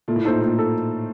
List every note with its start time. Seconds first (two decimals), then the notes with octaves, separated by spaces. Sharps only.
0.08 A#2 A3
0.16 A2
0.24 A#2 D#4 A4 C5
0.40 A#2 A3
0.56 D#4 A4